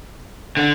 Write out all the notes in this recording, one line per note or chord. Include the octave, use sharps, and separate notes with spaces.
D3